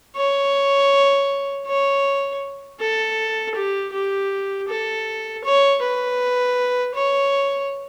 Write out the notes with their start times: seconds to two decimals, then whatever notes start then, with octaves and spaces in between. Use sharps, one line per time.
0.16 C#5
1.67 C#5
2.80 A4
3.55 G4
3.93 G4
4.68 A4
5.44 C#5
5.82 B4
6.95 C#5